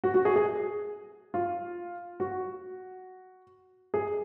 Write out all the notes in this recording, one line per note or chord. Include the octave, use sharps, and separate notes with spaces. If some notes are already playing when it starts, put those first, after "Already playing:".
F#4
F#4
G#4
G#4
F4
F#4
G#4